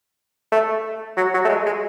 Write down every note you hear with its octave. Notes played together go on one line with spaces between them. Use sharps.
A3
F#3
F#3
A3
G#3
G#3